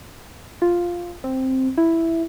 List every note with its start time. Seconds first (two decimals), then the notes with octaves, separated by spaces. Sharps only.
0.62 F4
1.24 C4
1.78 E4